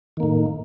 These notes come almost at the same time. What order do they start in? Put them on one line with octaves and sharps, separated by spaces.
D#3 A#3 A2